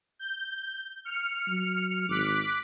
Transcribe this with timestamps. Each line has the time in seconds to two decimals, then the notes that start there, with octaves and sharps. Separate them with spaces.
0.19 G6
1.05 F6 C#7
1.47 F#3
2.09 G#1 D6 F#6 B6